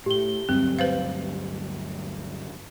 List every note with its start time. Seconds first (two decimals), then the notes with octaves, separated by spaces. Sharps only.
0.06 A2 G4 G7
0.49 D2 G2 F#3 C4
0.79 B4 C5 F5